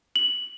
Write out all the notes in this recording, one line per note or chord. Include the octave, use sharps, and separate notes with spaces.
F#7